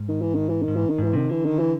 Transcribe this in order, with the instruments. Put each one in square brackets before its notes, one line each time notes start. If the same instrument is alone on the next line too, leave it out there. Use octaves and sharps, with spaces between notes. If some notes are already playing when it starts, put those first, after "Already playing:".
Already playing: [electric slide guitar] G#2
[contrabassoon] D#3
E3
D#3
E3
D#3
[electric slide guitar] G#2
[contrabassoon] E3
D#3
[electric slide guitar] G#2
[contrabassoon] E3
[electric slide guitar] C3 [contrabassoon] D#3
[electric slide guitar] D3 [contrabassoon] E3
[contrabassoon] D#3
E3